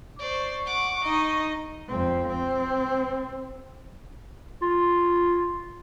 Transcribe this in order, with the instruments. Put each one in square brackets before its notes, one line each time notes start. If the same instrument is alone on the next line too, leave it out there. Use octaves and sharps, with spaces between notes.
[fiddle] C5 D5 [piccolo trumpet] C#6
[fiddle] F#5 D6
[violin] D#4 [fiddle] D#5
[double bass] F2 C4
C4
[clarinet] F4